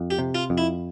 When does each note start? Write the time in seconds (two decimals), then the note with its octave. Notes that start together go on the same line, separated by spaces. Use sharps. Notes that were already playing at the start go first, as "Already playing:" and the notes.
Already playing: F2
0.11 G4
0.19 C3
0.35 F4
0.50 F2
0.58 E4